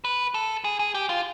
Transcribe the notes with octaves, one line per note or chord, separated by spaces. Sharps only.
B4
A4
G#4
G#4
G4
F4